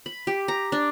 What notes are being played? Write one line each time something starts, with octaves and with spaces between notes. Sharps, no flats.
B5
G4
A#5
D4